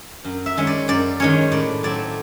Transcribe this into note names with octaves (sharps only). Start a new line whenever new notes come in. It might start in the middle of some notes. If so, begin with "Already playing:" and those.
F#2
E5
D#3 G#3 C#4
D5
F#2 D5
D#3 G#3 C#4 C#5
A2 D5
F#3 A3 C4 D5